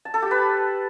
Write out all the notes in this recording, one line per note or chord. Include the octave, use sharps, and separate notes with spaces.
A5
A4
G4
B4